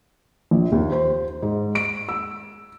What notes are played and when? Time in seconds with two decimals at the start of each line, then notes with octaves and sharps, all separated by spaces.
0.51 A#1
0.72 D#2
0.92 C5
1.42 G#2
1.75 D7
2.09 E6